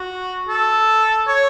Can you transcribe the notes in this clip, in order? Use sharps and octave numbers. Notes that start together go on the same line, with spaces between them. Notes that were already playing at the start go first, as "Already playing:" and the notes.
Already playing: F#4
A4
C#5